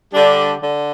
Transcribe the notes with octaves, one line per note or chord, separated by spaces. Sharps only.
D3 G3 D4 G4
D3